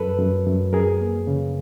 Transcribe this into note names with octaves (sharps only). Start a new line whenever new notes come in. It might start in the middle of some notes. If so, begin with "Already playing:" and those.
Already playing: F#2 A4 B4
F#2
F#2
F#2 G#4 A#4
A#3
C#3